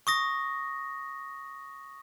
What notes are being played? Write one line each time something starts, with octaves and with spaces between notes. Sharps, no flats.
C#6 D#6 A#6